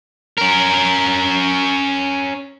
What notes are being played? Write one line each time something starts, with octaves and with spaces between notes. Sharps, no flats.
C#4 A#4